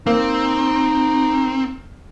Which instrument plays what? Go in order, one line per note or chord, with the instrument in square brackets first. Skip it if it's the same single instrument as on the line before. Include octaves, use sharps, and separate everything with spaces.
[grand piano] A#3 [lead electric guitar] C4 [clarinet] D#4